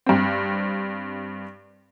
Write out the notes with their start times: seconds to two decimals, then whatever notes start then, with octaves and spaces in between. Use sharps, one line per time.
0.06 G2 C4